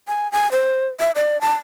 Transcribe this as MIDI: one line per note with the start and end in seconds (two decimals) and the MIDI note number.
0.08 0.30 80
0.32 0.50 80
0.52 0.88 72
1.00 1.11 76
1.15 1.40 74
1.41 1.53 81